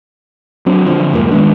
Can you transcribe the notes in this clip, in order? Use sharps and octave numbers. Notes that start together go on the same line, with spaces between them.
F#3 C4 D4
D3 F3
C2 F2 G#2 A#3
D#3 G#3 B3 D4